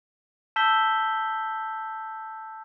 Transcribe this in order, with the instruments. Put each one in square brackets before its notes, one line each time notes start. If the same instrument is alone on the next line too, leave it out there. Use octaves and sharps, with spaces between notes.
[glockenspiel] A5 E6 G6 B6 G7